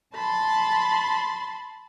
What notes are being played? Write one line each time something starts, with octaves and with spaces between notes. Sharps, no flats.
A5 B5 C6 A6